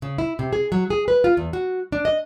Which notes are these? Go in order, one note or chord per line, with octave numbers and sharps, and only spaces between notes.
C#3
E4
C3
G#4
F#3
G#4
B4
F4
E2
F#4
D4
D#5